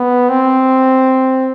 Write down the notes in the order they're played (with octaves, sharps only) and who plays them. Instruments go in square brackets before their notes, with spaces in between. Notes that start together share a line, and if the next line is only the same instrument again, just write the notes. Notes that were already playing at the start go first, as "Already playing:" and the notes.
Already playing: [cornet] B3
C4